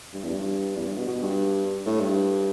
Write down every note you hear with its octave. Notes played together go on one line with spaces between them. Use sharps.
G2
E2
G2
E2
G2
B2
B2
G2
A2
G2